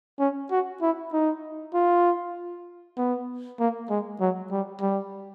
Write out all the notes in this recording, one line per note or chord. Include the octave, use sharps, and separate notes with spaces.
C#4
F#4
E4
D#4
F4
B3
A#3
G#3
F#3
G3
G3